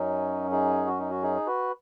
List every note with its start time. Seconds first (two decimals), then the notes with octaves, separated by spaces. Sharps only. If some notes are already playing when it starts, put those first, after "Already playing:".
Already playing: F#2 F#3 C#4 D#4
0.51 D#4 G#4
0.87 F#4
0.99 D#4
1.10 F#4
1.22 D#4 G#4
1.46 F#4 B4